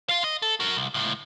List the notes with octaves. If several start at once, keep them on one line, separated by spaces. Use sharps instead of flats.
F4 F5
D#5
A4
F#4 A#4
C2
C#2 A2